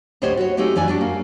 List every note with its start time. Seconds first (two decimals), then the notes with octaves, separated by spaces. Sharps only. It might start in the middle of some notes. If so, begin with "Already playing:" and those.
0.22 D2 A2 G4 C5 C#5 D#5
0.37 F#4 B4 C#5
0.57 G#3 A3 C4 D#4 F#4 G4
0.76 F2 E3 D5 G#5
0.88 G3 D4 F#4
1.01 A#3